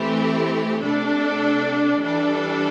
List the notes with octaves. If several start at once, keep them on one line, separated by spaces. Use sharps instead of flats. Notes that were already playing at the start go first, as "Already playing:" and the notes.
Already playing: E3 A3 C4 E4 G4
C3 A3 D4 A4
E3 G3 D4 A4